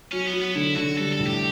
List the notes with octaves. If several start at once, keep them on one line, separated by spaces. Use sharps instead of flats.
F#3 C#4
B3
F#3
B3
D3 E4
D3 F#4
G3 A4
A4
A2
G4